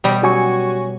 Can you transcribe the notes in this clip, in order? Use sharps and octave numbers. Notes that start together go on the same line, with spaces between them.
B2 G3 G4
F#3 C#4 F#4 G4 G#5 C#6